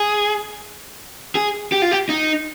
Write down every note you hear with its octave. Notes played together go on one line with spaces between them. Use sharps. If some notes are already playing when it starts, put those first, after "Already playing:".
Already playing: G#4
G#4
G4
F4
G4
D#4